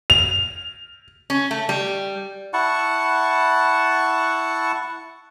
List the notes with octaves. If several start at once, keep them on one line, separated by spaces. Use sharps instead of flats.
F7
C#4
A3
G3
E4 F#5 A5 C#6